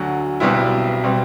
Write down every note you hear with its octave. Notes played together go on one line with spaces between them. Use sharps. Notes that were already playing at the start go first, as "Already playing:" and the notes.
Already playing: D2 D3 F#3
B1 B2 G3 C4 E4
B2 G3 C4